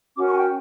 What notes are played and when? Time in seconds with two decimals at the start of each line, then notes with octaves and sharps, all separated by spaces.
0.16 C#4 F#4 A#4 D6
0.27 C#6
0.33 G#5
0.38 G5